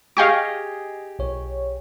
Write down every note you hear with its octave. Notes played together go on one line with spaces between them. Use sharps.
G4 G#4 D#5 F5 G5 C#6
B1 C#5